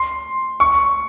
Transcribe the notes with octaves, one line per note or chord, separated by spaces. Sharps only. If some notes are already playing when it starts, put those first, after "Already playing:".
Already playing: C6
C#6